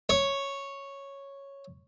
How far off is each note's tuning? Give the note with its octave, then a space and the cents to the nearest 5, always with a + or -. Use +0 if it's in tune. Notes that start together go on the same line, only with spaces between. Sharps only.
C#5 -5